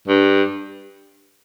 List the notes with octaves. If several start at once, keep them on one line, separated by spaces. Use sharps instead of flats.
G2